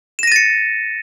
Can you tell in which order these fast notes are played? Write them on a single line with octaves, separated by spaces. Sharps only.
E7 A#6 D#7 A6 C#7